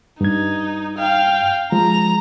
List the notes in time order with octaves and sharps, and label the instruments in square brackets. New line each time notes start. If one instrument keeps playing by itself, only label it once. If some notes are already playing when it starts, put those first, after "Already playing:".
[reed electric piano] G2 G#6 [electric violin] D#4
[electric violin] F5 G5
[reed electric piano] F3 G#3 [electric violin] A#5